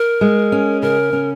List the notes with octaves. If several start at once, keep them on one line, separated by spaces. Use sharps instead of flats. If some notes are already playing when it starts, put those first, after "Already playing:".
Already playing: A#4
G#3
C#4
C#3 A#4
C#4